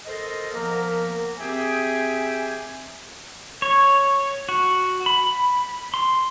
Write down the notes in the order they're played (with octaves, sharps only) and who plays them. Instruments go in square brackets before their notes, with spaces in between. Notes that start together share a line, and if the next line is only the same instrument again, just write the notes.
[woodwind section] A4 A#4 C5 D#5
F3 A#3 B3 A#4
C4 G4 G#4 E5 G5 G#5
[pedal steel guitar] C#5
F#4
B5
C6